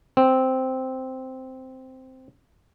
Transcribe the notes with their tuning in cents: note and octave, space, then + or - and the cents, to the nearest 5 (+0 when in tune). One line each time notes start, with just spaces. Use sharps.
C4 -5